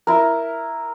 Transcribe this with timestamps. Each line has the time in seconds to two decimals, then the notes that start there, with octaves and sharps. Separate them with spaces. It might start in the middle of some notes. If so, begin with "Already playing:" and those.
0.07 E4 A#4